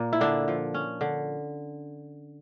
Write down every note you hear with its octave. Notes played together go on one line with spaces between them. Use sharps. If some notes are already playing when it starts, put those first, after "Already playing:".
Already playing: A#2 A#3
E4
D3 D4
F3
C#4
D3